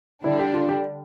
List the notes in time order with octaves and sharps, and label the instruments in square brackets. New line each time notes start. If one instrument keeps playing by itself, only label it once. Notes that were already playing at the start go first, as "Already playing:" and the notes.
[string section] D3 G3 D4 [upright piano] E4
[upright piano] G4
F4
G4